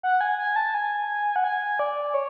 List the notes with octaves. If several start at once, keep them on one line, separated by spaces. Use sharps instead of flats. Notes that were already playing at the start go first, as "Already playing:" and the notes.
F#5
G#5
G#5
A5
G#5
F#5
G#5
D5
C#5